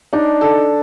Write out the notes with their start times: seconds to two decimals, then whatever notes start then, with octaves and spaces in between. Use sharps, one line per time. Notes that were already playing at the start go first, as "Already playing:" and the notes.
0.13 D4 D#4
0.41 A4